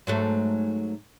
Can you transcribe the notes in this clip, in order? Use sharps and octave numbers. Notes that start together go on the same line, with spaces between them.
G#2 F#3 A3